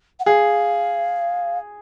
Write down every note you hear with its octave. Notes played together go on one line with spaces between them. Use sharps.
F#5
G#4 F5